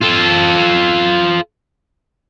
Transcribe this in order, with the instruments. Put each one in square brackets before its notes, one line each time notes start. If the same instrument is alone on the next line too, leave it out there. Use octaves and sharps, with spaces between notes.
[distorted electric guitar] F4 A4